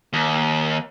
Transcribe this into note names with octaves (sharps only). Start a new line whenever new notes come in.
D#2